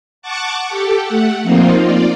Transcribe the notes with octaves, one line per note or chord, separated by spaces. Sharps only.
F#5 A5 C#6 D6
G4 A4
A3 F#5
F3 A#3 C4 D#4 F4
F4 D5